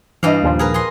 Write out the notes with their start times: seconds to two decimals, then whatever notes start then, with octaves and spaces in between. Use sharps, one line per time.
0.23 G2 E3 D#5 F5
0.43 D#2 A#2 F3
0.59 G#4 A#4 B4
0.74 G#4 D#5 C6